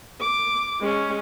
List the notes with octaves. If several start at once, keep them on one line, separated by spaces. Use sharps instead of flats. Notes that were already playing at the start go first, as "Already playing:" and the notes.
D6
G#3 C#4